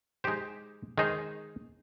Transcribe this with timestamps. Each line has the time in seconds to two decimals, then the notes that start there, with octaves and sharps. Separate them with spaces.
0.24 G#3 D#4 G4 C5
0.98 D#3 G#3 D#4 G#4 C5